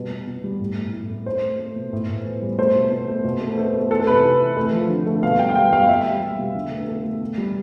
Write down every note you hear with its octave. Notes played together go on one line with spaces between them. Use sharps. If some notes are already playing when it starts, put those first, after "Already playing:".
Already playing: B2 G3
B2
B2
G3
A2
A2
A2
A3
A3 C5
A3
A3
B2
A2
A2
E3
G3
A3 C5
B2
B2
A3
B2
A3
A3
A3
E3 A4
C3 B4
E3
E3
A3
F3
D3
A3
B2 F5
G3 G5
F5
G3 G5
G3 F5
G3 E5
G3
G3
B2
D3
A3
A3
A3
B2
G3